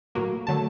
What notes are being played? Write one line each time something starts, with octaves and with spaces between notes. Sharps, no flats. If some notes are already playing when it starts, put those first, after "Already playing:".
A2 F#3 A#3
D3 F#3 A3 A5